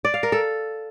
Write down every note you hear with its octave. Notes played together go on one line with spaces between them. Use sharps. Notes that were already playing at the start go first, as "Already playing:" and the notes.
D5
F5
A#4
A4